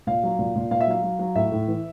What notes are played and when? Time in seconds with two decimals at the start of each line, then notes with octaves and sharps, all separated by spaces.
0.07 A#2 F5
0.23 F#3
0.39 A#2
0.56 A#2
0.71 A#2 F5
0.81 E5
0.87 F#3 F5
1.03 F#3
1.19 F#3
1.35 A2 E5
1.52 A2
1.68 E3